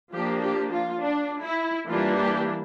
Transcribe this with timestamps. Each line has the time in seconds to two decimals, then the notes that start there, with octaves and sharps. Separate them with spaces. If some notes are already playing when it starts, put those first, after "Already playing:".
0.13 F3 A#3 D4 G4
0.42 G4
0.71 F4
1.01 D4
1.44 E4
1.87 E3 G3 A#3 D4 F4
2.17 G4